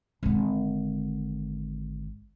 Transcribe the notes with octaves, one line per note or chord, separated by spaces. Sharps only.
G#1 D3